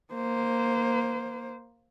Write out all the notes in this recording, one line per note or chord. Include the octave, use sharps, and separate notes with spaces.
A#3 C5